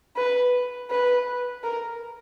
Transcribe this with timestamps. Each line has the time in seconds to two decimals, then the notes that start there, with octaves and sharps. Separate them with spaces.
0.16 B4
0.91 B4
1.64 A#4